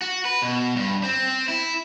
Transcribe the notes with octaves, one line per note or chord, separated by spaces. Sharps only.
F#4
B4
B2
G2
C4
E4